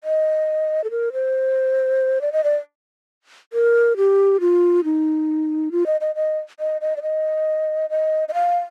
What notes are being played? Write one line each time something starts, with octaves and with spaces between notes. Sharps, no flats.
D#5
A4
A#4
C5
D5
D#5
D5
A#4
G4
F4
D#4
F4
D#5
D#5
D#5
D#5
D#5
D5
D#5
D#5
D#5
F5